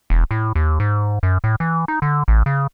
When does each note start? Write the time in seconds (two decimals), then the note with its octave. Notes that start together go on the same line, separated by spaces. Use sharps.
0.10 E1
0.31 A2
0.55 D#2
0.80 G#2
1.23 F#2
1.44 A2
1.60 E3
1.88 D#4
2.02 D3
2.28 A1
2.46 C#3